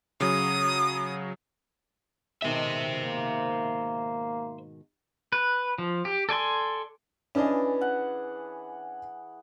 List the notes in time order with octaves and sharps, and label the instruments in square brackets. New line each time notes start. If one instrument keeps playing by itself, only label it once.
[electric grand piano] C#3 F#3 [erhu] D#6
[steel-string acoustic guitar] G#2 B2 D#3 [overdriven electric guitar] C5 E5
[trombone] A#3
[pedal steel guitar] B4
F3
G4
A4 D5 G#5 C6
[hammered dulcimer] E3 G#4 A5 [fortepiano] C#4 D4 D#5
[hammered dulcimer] F#5